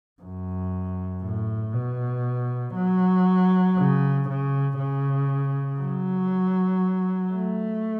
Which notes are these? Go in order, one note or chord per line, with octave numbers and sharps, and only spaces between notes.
F#2
A2
B2
F#3
C#3
C#3
C#3
F#3
A3